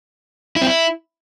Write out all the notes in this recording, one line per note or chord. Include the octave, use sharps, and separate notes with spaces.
E4
C4
E4